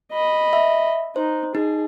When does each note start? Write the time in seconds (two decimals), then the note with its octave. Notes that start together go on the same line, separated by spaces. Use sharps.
0.13 D#5 B5
0.53 E5
1.16 D#4 C5
1.55 D#4 G#4